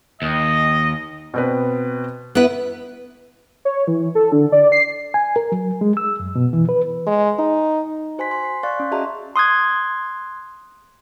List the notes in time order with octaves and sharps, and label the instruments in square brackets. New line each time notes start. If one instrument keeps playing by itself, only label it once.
[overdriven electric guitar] D#2 [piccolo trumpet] D#5
[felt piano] B2 C4 B4
[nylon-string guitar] B3 E4 B4
[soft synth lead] C#5
E3
A4
D3
D5
C7
[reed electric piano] G#5
A#4
F#3
G#3
E6
F#2
B2
E3
B4
[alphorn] G#3
D#4
[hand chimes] F#4 C5 G#5 C6 B6
C6
C7
D5 F5 C6 C#6 F#6 A6
C#4
F#4 G#4 D#5 E5 A5 A#5
[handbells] C6 D#6 F#6 G#6